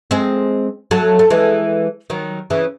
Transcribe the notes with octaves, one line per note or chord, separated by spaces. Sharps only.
G#3 C4
F#3 A3
A3
E3 G#3
D#3 F#3
C#3 E3